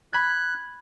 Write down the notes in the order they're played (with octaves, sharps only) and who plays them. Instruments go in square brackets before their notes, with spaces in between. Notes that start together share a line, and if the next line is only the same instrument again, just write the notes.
[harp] B5 G#6 [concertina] F#6